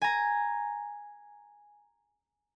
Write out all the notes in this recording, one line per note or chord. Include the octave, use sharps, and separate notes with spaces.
G#5 A#5